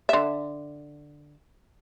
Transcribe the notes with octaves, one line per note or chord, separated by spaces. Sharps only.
D3 E5